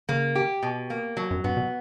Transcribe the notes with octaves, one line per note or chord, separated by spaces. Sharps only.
C#3 A#3
G4
B2
A#3
F#3
F#2
G2 B3
B2